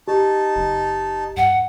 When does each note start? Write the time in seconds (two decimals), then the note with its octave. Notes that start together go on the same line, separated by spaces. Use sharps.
0.08 D#4 G4 A5
0.56 F#1
1.37 G2 F#5